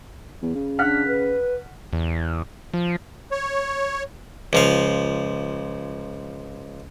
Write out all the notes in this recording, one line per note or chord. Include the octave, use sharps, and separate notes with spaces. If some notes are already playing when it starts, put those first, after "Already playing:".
E2
C#3
D4 F#5 F6 B6
B4
E2
F3
C#5
C#2 F3 F5